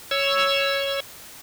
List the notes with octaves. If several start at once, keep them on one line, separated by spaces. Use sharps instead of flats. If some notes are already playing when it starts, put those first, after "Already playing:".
C#5 E6